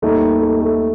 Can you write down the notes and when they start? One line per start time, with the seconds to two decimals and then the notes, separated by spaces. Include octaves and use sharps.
0.02 D#2 D#3 G3 A3 D#4
0.42 A3
0.61 A3